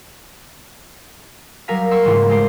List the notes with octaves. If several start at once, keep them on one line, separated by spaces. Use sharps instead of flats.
F#3 G3 A#4 F5 G#5 B6
E5 G5 C6 C#6 E6
G#2 C#3 E3 A#3 F4
G#3 A3 G4 C5